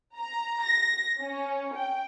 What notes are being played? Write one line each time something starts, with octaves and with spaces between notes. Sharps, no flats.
A#5
A#6
C#4
G5